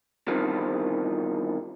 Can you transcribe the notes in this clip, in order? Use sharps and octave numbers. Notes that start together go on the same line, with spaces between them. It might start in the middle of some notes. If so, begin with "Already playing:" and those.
E2 G2 C3 D#3 F3